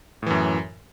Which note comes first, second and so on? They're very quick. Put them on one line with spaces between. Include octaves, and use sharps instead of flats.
A2 E3 F#2